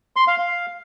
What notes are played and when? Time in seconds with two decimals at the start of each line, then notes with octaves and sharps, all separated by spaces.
0.16 C6
0.27 F5
0.39 F5